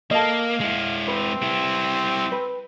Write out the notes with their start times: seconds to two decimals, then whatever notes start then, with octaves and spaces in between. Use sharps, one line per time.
0.11 A#3 A4 D#5 F5
0.60 G#3 E4
1.07 C4 B4
1.42 G3 E4
2.32 B4